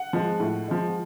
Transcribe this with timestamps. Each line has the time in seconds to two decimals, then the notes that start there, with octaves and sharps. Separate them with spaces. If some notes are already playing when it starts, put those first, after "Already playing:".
Already playing: F#5
0.13 F3 G#3
0.39 A2
0.68 F3 G#3